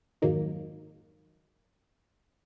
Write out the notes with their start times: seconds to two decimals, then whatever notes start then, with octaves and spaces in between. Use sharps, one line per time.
0.22 F2 G#2 D#3 F#3 A#3 D#4